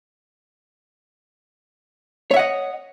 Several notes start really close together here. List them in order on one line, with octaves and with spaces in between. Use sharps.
C#5 E5 F#5 D#5